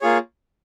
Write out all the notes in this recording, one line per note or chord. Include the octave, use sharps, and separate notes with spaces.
A#3 F4 G#4 C#5